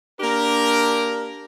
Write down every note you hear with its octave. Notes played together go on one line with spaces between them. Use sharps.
A#3 D4 G4 A#4